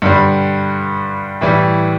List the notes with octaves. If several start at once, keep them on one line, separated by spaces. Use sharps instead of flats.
G2 D3 G3
A2 E3 G3